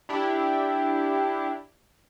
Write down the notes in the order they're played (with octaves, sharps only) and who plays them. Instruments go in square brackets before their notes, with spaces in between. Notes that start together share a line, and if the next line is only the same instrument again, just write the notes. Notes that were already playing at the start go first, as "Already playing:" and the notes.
[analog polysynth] D4 E4 G4